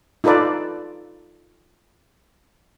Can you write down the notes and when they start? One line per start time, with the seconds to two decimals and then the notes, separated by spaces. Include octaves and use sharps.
0.24 D#4 F4 A4 B4 D5